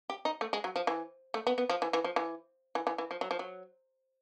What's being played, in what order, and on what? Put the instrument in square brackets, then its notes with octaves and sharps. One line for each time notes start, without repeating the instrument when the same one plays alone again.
[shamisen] G4
D#4
A3
G#3
F#3
F3
E3
A3
B3
B3
F3
E3
E3
F3
E3
E3
E3
E3
F3
F#3
F3
F#3